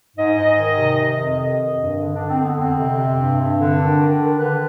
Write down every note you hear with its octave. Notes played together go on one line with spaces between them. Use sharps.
G#2 D#5
G#2
D#3
C3
C3
F2
D#3 D#5
D#3
G2
D3
D3 D4
C4
D3
B3
F2 C4
C3
C3
G2
G2
D3
D#3 D4
D#3
D#3
D3 B4